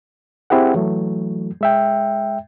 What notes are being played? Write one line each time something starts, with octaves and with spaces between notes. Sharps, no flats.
C4 E4 G4 G#4 F#5
E3 F#3 A3
G#3 E5 G5